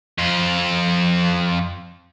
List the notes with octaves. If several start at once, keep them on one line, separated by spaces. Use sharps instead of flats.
F2 F4